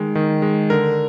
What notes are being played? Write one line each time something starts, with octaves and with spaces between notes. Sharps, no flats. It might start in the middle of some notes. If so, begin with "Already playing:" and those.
Already playing: D#3 G#3
D#3
G#3
D3 A#4